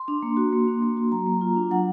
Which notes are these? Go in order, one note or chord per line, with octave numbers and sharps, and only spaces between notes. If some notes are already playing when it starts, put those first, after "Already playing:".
Already playing: C6
D4
A#3
F#4
A#3
D4
A#3
F#4
F#3 A#5
A#3
F4
D4
F#3 F#5